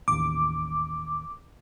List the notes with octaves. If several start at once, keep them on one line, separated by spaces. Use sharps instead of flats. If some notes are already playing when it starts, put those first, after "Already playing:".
A1 D#2 D6